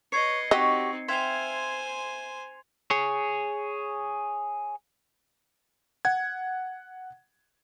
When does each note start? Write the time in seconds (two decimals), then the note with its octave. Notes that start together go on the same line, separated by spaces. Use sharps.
0.12 B4 C#5 D#5 G#6 C7 C#7
0.51 C4 D#4 F#4 G4 C#5 D#5
1.08 C5 E5 F5 G5 G#5 C6 G#6 F7
2.90 G#4 C#5
6.05 F#5 G#6